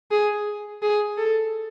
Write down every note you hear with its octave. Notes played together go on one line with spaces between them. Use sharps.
G#4
G#4
A4